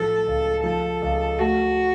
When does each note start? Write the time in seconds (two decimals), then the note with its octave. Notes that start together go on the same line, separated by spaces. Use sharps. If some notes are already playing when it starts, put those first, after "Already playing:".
Already playing: A2 F3 A4
0.27 C#2
0.64 F3 A4
1.02 C#2
1.38 A3 F#4